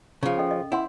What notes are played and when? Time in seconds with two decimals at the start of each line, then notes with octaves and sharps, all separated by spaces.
0.23 C#3 F3
0.38 C#4 A4 D#5
0.51 D#5
0.72 E4 C#5 F#5 C6